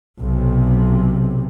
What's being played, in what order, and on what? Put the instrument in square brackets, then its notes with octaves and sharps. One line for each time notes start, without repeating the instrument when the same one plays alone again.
[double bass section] B1 C3